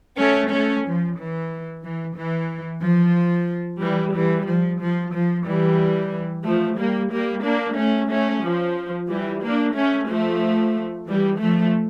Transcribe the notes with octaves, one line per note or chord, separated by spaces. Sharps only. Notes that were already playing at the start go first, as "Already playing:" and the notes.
A3 C#4
A3 C#4
F3
E3
E3
E3
F3
E3 G3
E3 G3
F3
F3
F3
E3 G3
F3 A3
G3 A#3
G3 A#3
A#3 D4
A3 C#4
A3 C#4
F3
E3 G3
A#3 D4
A3 C#4
F3 A3
E3 G3
F3 A3